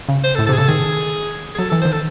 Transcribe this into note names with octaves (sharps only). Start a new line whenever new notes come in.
C#3
C5
A4
A2
A4
C3 G#4
C#3 A4
D#3 G#4
G#4
F#3 A4
E3 A4
C5
D#3
A4